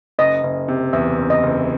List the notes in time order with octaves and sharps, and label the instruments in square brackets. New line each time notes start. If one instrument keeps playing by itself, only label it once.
[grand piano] F#1 [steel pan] D#5
[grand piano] F#1
C3
[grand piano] E2 [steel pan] E5
[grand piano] F#1
[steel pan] D#5
[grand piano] F#1